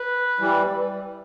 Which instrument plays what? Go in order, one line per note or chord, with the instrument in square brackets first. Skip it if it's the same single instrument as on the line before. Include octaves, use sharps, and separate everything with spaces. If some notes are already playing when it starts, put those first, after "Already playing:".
Already playing: [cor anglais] B4
[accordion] E3 G3